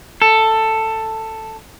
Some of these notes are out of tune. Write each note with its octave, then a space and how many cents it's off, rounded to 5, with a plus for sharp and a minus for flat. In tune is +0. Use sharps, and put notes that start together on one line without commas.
A4 +10